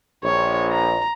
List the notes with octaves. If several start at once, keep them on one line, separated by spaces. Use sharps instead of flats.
A#1 C#5
A#5